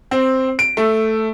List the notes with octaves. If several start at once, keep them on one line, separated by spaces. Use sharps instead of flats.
C4
D7
A3